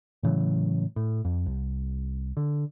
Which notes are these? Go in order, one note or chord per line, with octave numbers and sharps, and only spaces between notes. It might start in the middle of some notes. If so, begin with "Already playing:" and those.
A2 C#3 E3 F#3
A2
F2
C2
D3